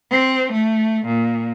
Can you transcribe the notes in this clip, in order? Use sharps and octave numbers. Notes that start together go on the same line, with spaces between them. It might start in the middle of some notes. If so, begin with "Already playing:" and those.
C4
A3
A#2